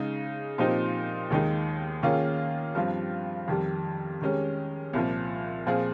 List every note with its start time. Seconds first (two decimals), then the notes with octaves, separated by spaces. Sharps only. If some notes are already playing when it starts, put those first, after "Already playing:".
Already playing: C#3 G#3 D#4
0.58 A#2 F3 C4 D#4 G4
1.30 D#2 D#3 G#3 D#4
2.03 D#3 A#3 C#4 F4 G#4
2.75 G2 F3 C4 F4
3.48 F2 D#3 G3
4.21 D#3 G#3 C#4 G4
4.93 C2 A#2 F3
5.66 A#2 F3 C4 F4 G#4